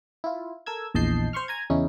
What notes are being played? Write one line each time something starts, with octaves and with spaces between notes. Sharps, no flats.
E4 F4
A4 A#4 E6 G#6
A#1 E2 D#5 A5 G6 C7
C5 C6 C#6 F6
G#5 A#5 G#6
E2 C#3 C#4 D#4 E4